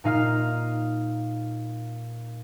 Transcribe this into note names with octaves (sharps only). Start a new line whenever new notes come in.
A#2 D#4 F5 F6